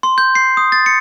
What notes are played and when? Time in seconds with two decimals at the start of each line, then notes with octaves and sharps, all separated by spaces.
0.03 C6
0.18 G6
0.35 C7
0.57 D#6
0.72 A6
0.86 C#7